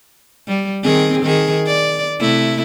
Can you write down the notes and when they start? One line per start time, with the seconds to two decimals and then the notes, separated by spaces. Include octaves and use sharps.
0.48 G3
0.83 D#3 C4 G#4
1.23 D#3 G#4
1.66 D5
2.20 C3 A3 E4